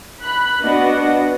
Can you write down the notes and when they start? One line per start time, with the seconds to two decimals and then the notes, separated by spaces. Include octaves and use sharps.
0.23 B5 F#6
0.60 B3 D4 F#4 B4 D#5 F#5